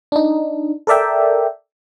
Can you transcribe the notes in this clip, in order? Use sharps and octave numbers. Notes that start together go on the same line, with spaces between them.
D4 D#4
A4 A#4 D5 E5 G5